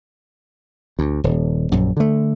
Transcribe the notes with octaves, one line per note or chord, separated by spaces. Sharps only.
D2
D#1
A#1 F#2
D3 A3